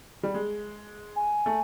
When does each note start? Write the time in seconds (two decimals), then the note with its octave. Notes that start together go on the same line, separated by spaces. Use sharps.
0.23 G3
0.34 G#3
1.16 G#5
1.46 A3